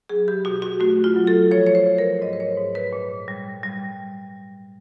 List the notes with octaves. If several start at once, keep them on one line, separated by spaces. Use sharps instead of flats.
F#3 G#4
G4
B2 F#4
F#4
A3 F#4
F4
F#3
A4
F3 C#5
C#5
C5
F3
A#4
G#2 D#5
C5
C#5
G#2
B4
A#2
G3
G3